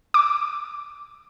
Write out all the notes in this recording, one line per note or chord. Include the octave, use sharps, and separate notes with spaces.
D6